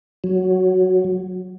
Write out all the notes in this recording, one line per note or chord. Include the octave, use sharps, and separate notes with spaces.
F#3